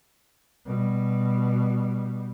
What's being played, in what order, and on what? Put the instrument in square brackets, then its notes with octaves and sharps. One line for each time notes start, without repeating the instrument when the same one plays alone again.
[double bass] B2 G3